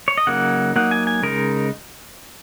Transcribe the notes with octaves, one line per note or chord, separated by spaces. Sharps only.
C#5
D#5
C#3 F#3 A#3 D#4 F#5
F#3 A#3 D#4 F#5
G#5
G#5
C#3 G#3 D#4 A#4